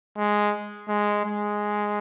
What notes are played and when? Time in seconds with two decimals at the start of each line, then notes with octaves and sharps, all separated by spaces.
0.17 G#3
0.88 G#3
1.25 G#3